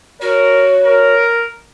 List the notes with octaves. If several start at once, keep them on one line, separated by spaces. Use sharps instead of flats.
F#4 A#4 C#5
A#4